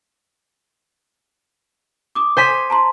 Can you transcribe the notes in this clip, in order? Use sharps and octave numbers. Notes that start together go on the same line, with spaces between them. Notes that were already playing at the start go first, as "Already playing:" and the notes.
D6 D#6
C5 G#5 B6
A5 A#5 C6